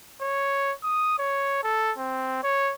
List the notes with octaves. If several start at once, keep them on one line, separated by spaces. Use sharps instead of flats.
C#5
D#6
C#5
A4
C4
C#5